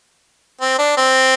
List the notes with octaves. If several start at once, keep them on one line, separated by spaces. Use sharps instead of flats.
C4
D4
C4